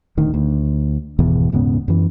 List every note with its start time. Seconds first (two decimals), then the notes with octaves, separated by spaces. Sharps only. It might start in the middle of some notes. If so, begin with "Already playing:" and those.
0.17 D#1 D2 D#3
0.34 D2
1.19 G#1 E2 B2
1.52 D#1 G#2 C#3 B3
1.88 F#2 E3